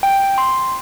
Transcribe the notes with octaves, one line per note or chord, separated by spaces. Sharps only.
G5
C6